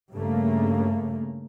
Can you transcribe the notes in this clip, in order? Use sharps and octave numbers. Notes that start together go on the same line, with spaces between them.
G2 C#3 A3 A#3